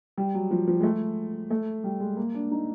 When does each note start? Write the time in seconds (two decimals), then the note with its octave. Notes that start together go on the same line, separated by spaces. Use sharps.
0.18 G3
0.34 F#3
0.51 F3
0.68 F3
0.80 G#3
0.83 A3
1.50 A3
1.84 G3
2.00 G#3
2.17 A#3
2.34 D4
2.51 D#4